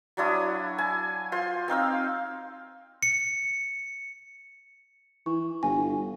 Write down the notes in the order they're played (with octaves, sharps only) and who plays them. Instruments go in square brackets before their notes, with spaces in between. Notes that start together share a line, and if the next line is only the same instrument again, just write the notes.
[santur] F#3 D4 E4 D#6
G#5
F4 C5 C6
C4 D#4 F5 E6
[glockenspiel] C#7
[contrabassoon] E3 [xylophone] C#6
[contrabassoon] G1 [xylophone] G#5